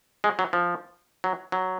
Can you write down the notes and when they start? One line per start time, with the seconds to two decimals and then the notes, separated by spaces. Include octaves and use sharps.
0.24 G#3
0.39 F#3
0.53 F3
1.24 F#3
1.52 F#3